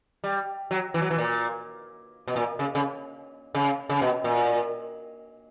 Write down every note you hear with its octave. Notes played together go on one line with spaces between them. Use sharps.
G3
F#3
E3
F#3
E3
A#2
B2
A#2
C#3
C#3
C#3
C#3
B2
A#2